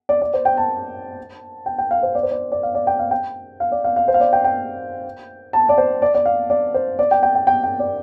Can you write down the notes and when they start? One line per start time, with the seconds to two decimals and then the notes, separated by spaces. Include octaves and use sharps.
0.09 D5
0.21 D5
0.34 C5
0.45 G5
0.57 A5
1.66 G5
1.78 G5
1.91 F5
2.03 C5
2.15 D5
2.23 C5
2.31 D5
2.52 D5
2.63 F5
2.75 D5
2.87 G5
2.99 F5
3.11 G5
3.60 F5
3.72 D5
3.84 F5
3.96 F5
4.08 C5
4.14 F5
4.20 D5
4.33 G5
4.44 G5
5.53 A5
5.69 D5
5.78 C5
6.02 D5
6.15 D5
6.25 F5
6.50 D5
6.74 C5
6.99 D5
7.11 G5
7.23 G5
7.35 G5
7.47 G5
7.63 G5
7.79 D5